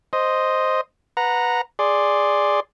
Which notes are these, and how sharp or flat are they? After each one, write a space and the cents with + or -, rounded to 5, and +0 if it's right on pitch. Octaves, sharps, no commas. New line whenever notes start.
C5 +0 D#5 +0
B4 +0 F#5 -15 A#5 -5
G#4 -5 D5 +0 C6 +0